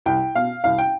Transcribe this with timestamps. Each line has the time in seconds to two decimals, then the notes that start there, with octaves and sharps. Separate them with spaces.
0.06 C2 G5
0.35 B2 F5
0.64 C2 F5
0.78 G5